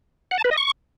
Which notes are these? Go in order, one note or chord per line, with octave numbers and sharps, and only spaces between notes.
F#5
A5
B4
D#5
C#6